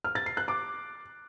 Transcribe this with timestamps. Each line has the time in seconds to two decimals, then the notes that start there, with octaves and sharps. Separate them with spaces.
0.04 F6
0.15 A6
0.26 C7
0.37 F#6
0.48 D6